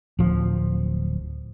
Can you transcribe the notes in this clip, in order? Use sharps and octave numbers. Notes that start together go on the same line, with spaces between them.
D1 F3